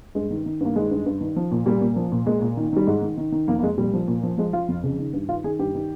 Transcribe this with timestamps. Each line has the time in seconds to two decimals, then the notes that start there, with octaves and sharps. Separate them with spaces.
0.15 G2 G#3
0.31 D#3
0.46 D#3
0.61 G2 A#3
0.76 D#3 G#3
0.91 G2
1.06 G2
1.21 D#3
1.36 F3
1.51 A#2
1.66 A#2 G3
1.81 A#2
1.96 F3
2.12 A#2
2.26 A#2 G#3
2.42 A#2
2.57 D#3
2.73 D#3 G3
2.87 G#2 G#3
3.02 D#3
3.18 D#3
3.32 D#3
3.48 F2 A#3
3.59 A#3
3.63 F2 G#3
3.77 A#2 G3
3.94 F3
4.08 A#2
4.23 F3
4.38 F3 G#3
4.53 F3 F4
4.69 F2
4.84 C#3
4.99 D#3
5.13 G2
5.28 D#3 F4
5.44 D#3 G#4
5.59 G2 G4
5.75 D#3